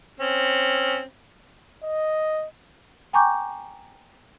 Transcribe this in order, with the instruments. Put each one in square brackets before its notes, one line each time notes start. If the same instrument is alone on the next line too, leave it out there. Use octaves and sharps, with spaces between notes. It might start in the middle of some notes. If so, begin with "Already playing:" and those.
[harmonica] C4 C#4
[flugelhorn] D#5
[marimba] G5 G#5 A#5 C#6 D6 G6